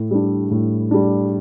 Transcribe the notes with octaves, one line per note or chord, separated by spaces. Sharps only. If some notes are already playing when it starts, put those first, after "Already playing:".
Already playing: A2
G3 D4
A2
G3 D4